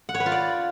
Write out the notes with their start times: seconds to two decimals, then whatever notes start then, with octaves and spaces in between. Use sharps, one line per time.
0.09 F#5
0.14 C#5
0.20 B4
0.26 F4
0.32 D5